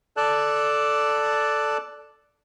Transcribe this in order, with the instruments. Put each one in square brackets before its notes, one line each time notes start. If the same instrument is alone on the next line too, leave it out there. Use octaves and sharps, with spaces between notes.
[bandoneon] A4 D5 A5 F#6